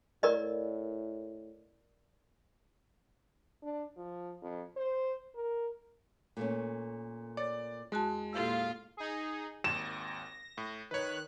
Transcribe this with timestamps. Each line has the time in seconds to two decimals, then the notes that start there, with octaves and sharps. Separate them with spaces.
0.23 A2 A#4 D5 D#5
3.63 D4
3.97 F3
4.42 F2
4.77 C5
5.35 A#4
6.37 A#2 A3 C#4
7.37 C#5 D5 A6
7.92 E2 G#3 F#4 A5
8.33 A#2 E4 F4 G4 A4 F5
8.97 D#4 G#4
9.64 G#1 D#2 A#6 E7
10.58 A2
10.91 D#3 B4 C#5 F#6